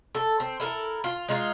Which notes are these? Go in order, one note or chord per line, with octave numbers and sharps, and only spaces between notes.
A4
C4
E4 A4 A#4
F4
G#3 D#4 F4